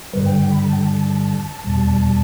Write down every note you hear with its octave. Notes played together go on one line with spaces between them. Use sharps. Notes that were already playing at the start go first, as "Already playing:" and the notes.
G2 D3 G3 B4
G5
G5
B5
A5
G5
A5
E2 B2 G3 A5